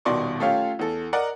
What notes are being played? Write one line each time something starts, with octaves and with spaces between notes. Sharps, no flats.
D#1 B2 D#3 D5 C6 C#6
A3 C#4 F4 G4 C#5 F5
E2 A4
A#4 D5 D#5 F#5 A#5